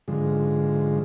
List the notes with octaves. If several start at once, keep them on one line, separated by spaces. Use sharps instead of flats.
G#2 D3 F3 G#3